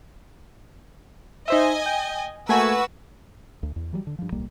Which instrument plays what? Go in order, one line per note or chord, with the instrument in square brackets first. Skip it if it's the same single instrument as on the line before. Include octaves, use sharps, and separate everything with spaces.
[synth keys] D#4 C5 E5 [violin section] D#5 G#5
[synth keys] G5
[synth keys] A3 A#3 G#5 [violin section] F#4 B4 E6
[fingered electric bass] D2
E2
E3 F#3 G3
D3
G2 F3
D1 B1 G3 A#3